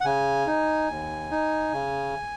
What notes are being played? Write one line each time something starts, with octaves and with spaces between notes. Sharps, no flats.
F#5
C#3 G#5
D#4
D#2
D#4
C#3